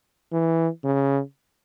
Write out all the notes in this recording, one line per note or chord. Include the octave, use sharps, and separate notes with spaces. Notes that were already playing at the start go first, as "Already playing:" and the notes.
E3
C#3